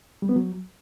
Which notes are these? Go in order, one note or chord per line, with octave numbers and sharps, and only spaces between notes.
G3
B3
F#3